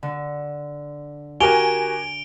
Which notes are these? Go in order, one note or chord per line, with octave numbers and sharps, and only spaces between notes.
D3
F#4 G4 A#4 G#5 D7 F7 G7